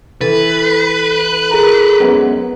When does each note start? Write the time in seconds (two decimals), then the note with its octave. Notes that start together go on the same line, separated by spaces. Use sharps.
0.21 E3 A4 B4
1.51 G#4 A#4 A#5
2.00 F#2 G#3 B3